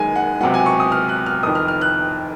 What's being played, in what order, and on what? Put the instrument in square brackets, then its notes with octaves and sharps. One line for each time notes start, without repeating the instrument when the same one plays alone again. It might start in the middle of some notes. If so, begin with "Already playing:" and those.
Already playing: [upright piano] F#1 F#2 D#3 G#3 G#5
F#5
C#2 C3 F#3 F#5
G#5
C#6
D#6
F6
F#6
F6
F1 F2 D#3 D#6
F6
F6
F#6